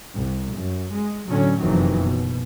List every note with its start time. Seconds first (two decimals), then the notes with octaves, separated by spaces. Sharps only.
0.16 C2
0.57 F#2
0.94 G#3
1.29 A2 D3 F#3 C#4
1.61 F#1 F2 C3 D#3 E3 F#3
1.99 B2